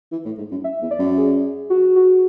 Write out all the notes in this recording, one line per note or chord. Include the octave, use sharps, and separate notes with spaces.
E3
A2
G#2
F#2
E5
E2
D5
F#2
G#4
F#4
F#4